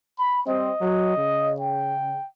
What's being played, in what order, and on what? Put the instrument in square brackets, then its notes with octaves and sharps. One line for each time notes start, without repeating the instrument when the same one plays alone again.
[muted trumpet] B5
[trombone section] G3 C4 [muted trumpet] D#5
[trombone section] F#3
C#3
[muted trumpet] G5